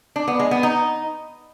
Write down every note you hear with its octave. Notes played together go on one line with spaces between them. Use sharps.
D4
B3
G#3
B3
D#4